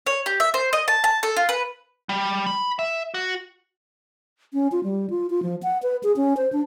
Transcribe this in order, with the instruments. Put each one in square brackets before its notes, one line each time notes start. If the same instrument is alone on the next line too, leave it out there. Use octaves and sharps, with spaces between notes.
[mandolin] C#5
G4
E5
C5
D#5
A5
A5
A4
F4
B4
[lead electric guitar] G3
B5
E5
F#4
[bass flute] C#4
F4
G3
F4
F4
F3
F#5
B4
G#4
C#4
C5
D4